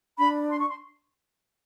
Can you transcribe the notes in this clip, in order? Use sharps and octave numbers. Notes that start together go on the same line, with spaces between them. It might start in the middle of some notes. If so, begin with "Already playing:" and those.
D4 B5
C6
C#6
C6